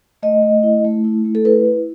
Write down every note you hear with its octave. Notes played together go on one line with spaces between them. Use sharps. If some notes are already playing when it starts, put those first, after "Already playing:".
A3 D#5
A3
E4
A3
E4
A3
A4
E4 B4
E4